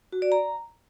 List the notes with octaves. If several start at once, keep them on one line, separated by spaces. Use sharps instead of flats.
F#4
D5
A#5